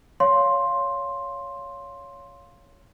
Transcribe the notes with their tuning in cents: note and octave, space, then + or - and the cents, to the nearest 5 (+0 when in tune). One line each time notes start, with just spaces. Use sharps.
C#5 +15 F5 +0 C6 +10